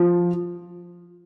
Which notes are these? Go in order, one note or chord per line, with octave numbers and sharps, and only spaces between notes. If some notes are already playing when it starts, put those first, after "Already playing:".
Already playing: F3